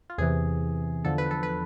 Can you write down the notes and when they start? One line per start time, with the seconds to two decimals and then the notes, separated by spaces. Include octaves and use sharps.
0.10 F4
0.18 E2 C3 E3 G#4
1.05 E2 D3 F3 A4
1.18 B4
1.31 A4
1.43 B4